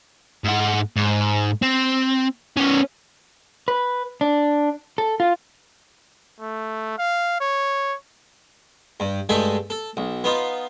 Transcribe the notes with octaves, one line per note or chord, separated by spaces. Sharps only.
G#2 F#5
G#2
C4
B3 C#4
B4
D4
A4
F4
A3
F5
C#5
G2
G2 G#3 A3 A4 E5 G#5
A4
B1
B3 D#4 F4